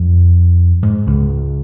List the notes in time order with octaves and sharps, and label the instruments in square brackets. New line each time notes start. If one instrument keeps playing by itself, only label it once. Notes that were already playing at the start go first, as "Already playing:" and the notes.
Already playing: [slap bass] F2
G#2
C#2 C#3